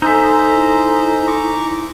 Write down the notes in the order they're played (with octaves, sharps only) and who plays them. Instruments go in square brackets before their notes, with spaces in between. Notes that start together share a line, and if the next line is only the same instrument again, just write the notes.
[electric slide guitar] D#4 E5 [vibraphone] A4 G#5 E6 [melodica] C5 D#5 A#5
[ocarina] E4
[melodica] A#5 C#6 D6